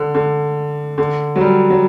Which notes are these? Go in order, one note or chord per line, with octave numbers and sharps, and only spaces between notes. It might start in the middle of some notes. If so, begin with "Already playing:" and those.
Already playing: D3
D3
D3
F#3
G3
F#3